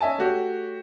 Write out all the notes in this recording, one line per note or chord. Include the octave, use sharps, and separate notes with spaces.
C#4 D#5 E5 G#5 A5
A3 F#4 G4 C#5